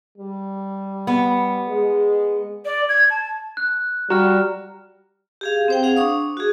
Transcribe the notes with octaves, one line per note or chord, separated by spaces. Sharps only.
G3
B3
G#3
D5
G#6
A5
F#6
G3 F#4 A#5 F6
G4 G#4 F5
C4 C5 G5
G#4 F5 F#5
D4 C#6 D#6
F#4 G#4